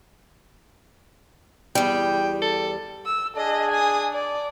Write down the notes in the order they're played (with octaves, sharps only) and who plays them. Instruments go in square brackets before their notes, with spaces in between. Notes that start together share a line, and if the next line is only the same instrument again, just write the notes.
[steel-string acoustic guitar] E2 G3 [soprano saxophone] G5
[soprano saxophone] A4
[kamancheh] E6
[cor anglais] D4 [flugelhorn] G#4 [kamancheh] D#5
[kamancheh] G#5 D#6
D5